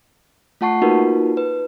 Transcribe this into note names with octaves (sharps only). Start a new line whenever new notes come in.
A3 F4 F#5 A5 C#6 C7
A#3 D#4 F4 F#4 A#4 B4
B4